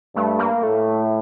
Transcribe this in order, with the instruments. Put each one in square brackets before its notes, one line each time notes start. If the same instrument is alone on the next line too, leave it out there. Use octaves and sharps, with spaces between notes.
[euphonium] G2 [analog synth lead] A3
[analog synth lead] A#3
[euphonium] A2 [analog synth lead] A3